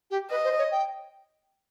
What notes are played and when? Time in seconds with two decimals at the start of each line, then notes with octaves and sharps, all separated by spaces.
0.11 G4
0.31 B4 D#5
0.44 C5
0.58 C#5
0.71 G5